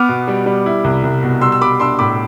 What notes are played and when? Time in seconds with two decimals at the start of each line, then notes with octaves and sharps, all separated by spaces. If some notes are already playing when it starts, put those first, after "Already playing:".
Already playing: B3 D6 F6
0.09 B2
0.28 G3
0.46 G3
0.66 E4
0.84 C2
1.03 C2
1.23 B2
1.41 G3 C6 E6
1.52 E6
1.61 G3 B5 D6
1.80 D4 C6 E6
1.99 A2 B5 D6